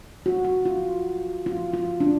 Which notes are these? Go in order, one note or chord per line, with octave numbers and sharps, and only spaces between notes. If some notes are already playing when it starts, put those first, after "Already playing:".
F#4
F#4
F4
F4
F4
D4